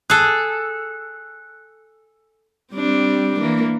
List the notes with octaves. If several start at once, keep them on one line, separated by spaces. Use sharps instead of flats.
G#4 A4 F#6
G3 C4 D4
E3 A#3